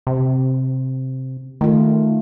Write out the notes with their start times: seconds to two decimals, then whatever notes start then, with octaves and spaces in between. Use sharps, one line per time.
0.07 C3
1.61 D#3 A3 F4